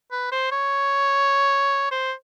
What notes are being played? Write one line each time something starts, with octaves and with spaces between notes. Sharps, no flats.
B4
C5
C#5
C5